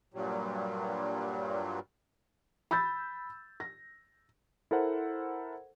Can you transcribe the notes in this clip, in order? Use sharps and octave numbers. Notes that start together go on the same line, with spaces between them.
G2 A#2 F#3 G3
B5 E6 G6 A6
A#6
E4 A4 A#4 C5 F#5